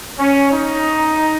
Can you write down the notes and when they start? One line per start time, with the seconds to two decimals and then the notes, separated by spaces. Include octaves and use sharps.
0.18 C#4
0.52 D#4